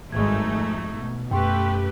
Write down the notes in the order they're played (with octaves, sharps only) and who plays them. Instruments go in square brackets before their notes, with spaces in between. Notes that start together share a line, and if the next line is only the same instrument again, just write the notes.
[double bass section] G#1 G2 G#3 [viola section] A3 D#4 [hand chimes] C#6 G#6
[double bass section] F2
B2
[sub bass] F#2 [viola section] A3 G4 B4 [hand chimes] G5 C6 C#6